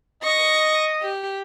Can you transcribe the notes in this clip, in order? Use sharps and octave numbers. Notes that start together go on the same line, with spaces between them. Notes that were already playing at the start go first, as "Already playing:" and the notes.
D#5 C#6 A#6
G4